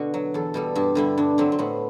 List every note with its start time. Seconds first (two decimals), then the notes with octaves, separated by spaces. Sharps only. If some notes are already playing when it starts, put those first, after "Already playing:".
Already playing: B2 D3 D4 F#4
0.14 F#3
0.34 E2 A4
0.54 B2 G3 A4
0.75 G2 G4
0.95 D3 G3 E4
1.18 G2 D4
1.38 D3 F#3 C4
1.52 C4
1.59 A2 B3